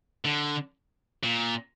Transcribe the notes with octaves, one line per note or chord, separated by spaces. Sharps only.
D3
A#2